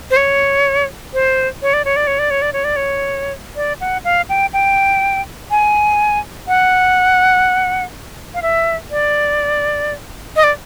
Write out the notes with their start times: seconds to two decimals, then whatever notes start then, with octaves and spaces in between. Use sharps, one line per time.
0.11 C5
0.16 C#5
1.14 C5
1.62 C#5
1.73 D5
1.85 C#5
1.96 D5
2.07 C#5
2.19 D5
2.31 C#5
2.42 D5
2.53 C#5
2.64 D5
2.76 C#5
3.56 D5
3.81 F#5
4.05 F5
4.29 G5
4.53 G5
5.51 G#5
6.48 F#5
8.34 F5
8.42 E5
8.91 D5
10.36 D#5
10.44 D5